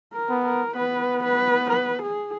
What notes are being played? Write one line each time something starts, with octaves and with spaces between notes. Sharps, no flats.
A#4
B3
A#4
B3 B4
B4
B4
G#4